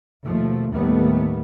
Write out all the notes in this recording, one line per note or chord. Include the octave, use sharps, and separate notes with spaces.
D#2 B2 F3 A3
D#2 A2 D#3 G3 A3 B3